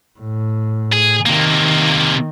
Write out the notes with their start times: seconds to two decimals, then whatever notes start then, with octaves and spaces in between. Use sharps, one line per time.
0.20 A2
0.92 G#4
1.26 C3 D#3 A#3